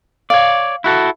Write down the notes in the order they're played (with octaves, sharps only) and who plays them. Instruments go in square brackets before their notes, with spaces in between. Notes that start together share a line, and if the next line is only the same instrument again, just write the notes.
[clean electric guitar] C#5 D5 [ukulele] F5
[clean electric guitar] E4 F#4 A4